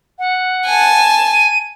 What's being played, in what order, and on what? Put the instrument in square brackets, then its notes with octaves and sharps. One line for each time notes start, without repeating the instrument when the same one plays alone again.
[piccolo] F#5
[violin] G#5 A5
[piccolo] D#7